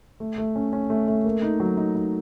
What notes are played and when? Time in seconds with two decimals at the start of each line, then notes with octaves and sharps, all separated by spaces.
0.20 A3
0.38 A3
0.56 C#4
0.73 C#4
0.90 A3
1.08 A3
1.25 A#3
1.42 D#4
1.60 F#3
1.77 D#4
1.95 D#4